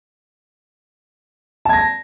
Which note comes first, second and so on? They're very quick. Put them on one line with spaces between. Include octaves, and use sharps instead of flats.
A5 G#6 A#6